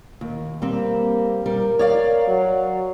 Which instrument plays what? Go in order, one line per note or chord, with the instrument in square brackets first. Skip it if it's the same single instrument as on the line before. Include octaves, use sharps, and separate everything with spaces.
[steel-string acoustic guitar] D#2
[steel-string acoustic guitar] G3 C4 [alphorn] A#3
[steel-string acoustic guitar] G3 [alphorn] A#4
[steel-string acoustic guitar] C#5 D5 F5
[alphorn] F#3